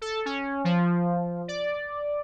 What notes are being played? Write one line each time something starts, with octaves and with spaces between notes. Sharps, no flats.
A4
C#4
F3
D5